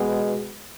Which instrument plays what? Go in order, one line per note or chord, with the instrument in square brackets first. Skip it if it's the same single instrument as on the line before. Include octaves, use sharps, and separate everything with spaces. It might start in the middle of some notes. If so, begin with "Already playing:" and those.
Already playing: [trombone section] B2 G#3 B3